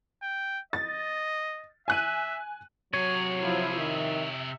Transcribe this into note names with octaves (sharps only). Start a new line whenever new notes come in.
G5
D#5 A6
E5 G#5 F#6 D#7
C3 F#3 G#4 C#5
F3 E4 F4
D#3 E5